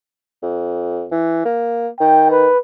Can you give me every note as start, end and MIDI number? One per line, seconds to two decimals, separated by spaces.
0.42 1.06 41
1.12 1.44 52
1.45 1.88 58
2.00 2.48 51
2.00 2.30 79
2.30 2.59 71